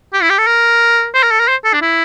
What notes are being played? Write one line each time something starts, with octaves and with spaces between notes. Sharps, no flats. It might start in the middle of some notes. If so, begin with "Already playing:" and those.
G4
E4
G4
A4
A#4
C5
A#4
A4
A#4
C5
A4
D4
E4